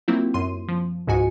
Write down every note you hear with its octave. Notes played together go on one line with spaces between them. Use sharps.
F#3 A#3 C4 E4 F4
F#2 C6 D#7
F3
C#2 G#2 F#4 G#5 C#7